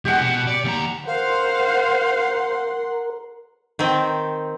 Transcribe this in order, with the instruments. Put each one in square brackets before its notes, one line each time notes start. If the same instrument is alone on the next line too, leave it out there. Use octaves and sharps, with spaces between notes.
[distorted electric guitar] E2 G#3 [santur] G4 F#5
[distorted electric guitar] B2
D5
D#2 A#5
[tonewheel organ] A#4 [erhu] C5 [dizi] F5 [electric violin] F#5 C6
[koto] D#3 C4